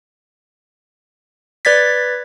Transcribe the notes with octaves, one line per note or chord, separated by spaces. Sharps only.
B4 D5 G#6 A6 B6